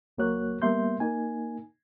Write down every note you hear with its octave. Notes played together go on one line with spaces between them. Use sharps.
C#2 F#3 A#3 F#4 C#5 F#6
G3 A#3 B3 E5 C6 G6
A#3 D#4 G#5